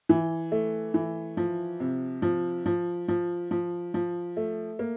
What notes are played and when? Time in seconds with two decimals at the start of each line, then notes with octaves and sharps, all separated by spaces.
0.09 E3
0.52 A3
0.94 E3
1.37 F3
1.80 C3
2.22 F3
2.66 F3
3.08 F3
3.51 F3
3.94 F3
4.37 A3
4.79 A#3